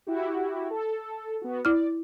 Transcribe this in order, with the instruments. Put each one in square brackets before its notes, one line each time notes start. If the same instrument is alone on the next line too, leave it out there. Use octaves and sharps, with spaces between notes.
[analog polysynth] E4 F#4 G4
A4
B3 F#4
[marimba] E4 F6 [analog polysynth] D5